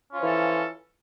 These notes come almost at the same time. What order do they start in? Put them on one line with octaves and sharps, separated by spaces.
C#4 F4 F3 E3 A4